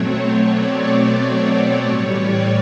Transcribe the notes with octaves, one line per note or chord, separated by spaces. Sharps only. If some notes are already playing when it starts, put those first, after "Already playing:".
Already playing: B2 F#3 A3 C4 C#5
D5
A2 E3 G3 C#5
D5